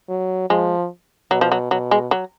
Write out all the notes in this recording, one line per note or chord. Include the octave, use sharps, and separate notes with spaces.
F#3
F3 G#3
B2 F#3
F3
F#3
B2 F#3
G#3
F#3